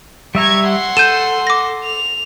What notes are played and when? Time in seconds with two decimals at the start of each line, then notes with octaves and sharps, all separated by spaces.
0.35 G3 E5 A#5 C#6 G#6
0.67 F#5 C6
0.97 A4 G6 D#7 E7
1.47 D6 A#6
1.85 F7